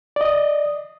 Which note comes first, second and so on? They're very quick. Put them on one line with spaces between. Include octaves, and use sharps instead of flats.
D5 D#5 D#6